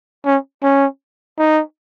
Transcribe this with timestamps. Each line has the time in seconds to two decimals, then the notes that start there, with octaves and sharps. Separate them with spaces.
0.25 C#4
0.63 C#4
1.38 D#4